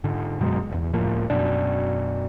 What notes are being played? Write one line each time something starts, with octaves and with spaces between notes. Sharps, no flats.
G#2 D3
F#2 B2 F#3 G#3
D#1 E2
C#2 A2 F3 A#3
F#2 B2 D4